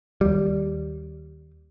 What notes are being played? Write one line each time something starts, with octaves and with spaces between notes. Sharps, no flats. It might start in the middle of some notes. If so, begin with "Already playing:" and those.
D#2 G3